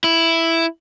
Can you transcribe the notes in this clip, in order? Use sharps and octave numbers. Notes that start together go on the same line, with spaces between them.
E4